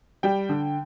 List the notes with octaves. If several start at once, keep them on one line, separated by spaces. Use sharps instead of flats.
G3 G5
D3